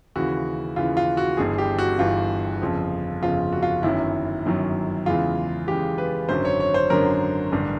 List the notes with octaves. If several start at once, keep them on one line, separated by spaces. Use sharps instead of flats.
D#2 C#3 E3 F#4
D#2 C#3 E3 F4
F4
F#4
G1 G2 E3 G#4
G4
F#4
G1 G2 E3 F4
G1 F2 C#3 F3
G1 F2 C#3 F3 F4
F#4
F4
G1 F#2 D#3 F#3 E4
G1 F#2 D#3 F#3
E2 C#3 E3 G#3 F4
E2 C#3 E3 G#3 G4
B4
G#1 F#2 D3 F#3 C5
C#5
C#5
C5
G#1 F#2 D3 F#3 A#4
A1 G2 D3